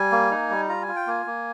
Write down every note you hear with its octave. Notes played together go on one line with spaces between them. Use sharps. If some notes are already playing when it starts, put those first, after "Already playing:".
Already playing: G3 G#5
A#3
D#4
G3
F4 A#5
G#5
F4
G5
A#3 G#5
A#3